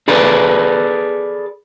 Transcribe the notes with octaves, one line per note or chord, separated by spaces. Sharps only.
G#4 A4 B4 D5